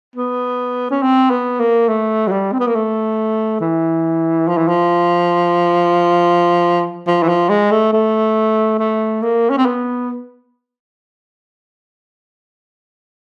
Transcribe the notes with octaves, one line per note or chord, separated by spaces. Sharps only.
B3
C#4
C4
B3
A#3
A3
F#3
G3
C4
B3
A#3
A3
E3
F3
E3
F3
F3
E3
F3
G#3
A3
A3
A3
A#3
C#4
C4
B3